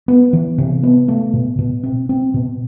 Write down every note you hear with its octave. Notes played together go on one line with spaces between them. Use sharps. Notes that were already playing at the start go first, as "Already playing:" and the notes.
B3
E3
C3
B3
A3
B2
B2
C4
C4
B2